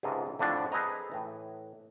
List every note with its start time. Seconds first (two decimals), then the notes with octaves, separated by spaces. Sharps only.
0.03 C#2 G#2 C3 F4 A4 D#5
0.27 A#1
0.39 F2 A2 D3 D4
0.72 G#4 A4 B4 C5 D#5 A#5
1.12 A2 E3